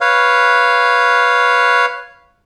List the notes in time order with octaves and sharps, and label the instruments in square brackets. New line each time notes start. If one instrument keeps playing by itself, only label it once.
[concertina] B4 C#5 F5